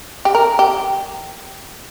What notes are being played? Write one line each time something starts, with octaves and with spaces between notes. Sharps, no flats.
G4
A#4
G4